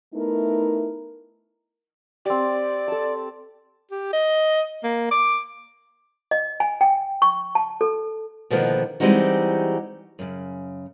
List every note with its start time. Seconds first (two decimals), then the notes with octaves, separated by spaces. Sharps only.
0.14 A3 B3 D#4 E4 A#4
2.25 C4 G4 D5
2.88 A4 A5
3.91 G4
4.13 D#5
4.84 A#3
5.11 D6
6.31 D#5
6.60 G#5
6.81 G5
7.22 C#6
7.55 A5
7.81 A4
8.50 B2 D3 D#3 F3 A#3 B3
9.00 E3 G3 G#3 C4 D#4 F#4
10.19 F#2 C#3